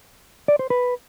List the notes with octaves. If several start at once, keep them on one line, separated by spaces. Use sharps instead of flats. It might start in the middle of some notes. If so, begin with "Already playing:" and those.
D5
C5
B4